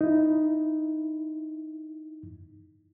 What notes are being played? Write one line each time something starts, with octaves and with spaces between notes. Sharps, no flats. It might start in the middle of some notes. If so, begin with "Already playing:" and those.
D#4 E4